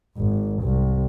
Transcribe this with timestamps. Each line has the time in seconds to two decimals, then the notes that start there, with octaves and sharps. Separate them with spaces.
0.17 G#1
0.63 C2